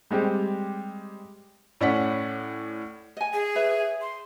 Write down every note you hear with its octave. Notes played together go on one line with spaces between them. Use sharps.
G3 G#3 C4 G4
A2 C#4 D5 F#5 B6
D#5 G#5
G#4
B4 C#5 E5
C6